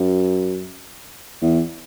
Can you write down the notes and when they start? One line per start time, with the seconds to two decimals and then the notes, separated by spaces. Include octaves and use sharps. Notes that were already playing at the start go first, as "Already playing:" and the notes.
Already playing: F#2
1.42 E2